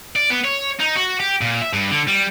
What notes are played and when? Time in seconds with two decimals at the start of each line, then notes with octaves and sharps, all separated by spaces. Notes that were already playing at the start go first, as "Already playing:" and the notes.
0.16 D5
0.30 B3
0.45 C#5
0.80 D#4
0.96 F#4
1.20 G4
1.41 A#2
1.62 E5
1.73 G2
1.91 D3
2.08 G3